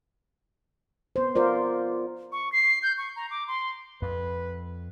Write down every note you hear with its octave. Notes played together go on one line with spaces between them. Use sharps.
B3 C5
F4 A#4 C5 D5
C#6
C7
G6
C#6
A#5
D6
C6
F2 B4